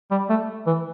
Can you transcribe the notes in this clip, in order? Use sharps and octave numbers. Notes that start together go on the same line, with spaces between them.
G3
A3
E3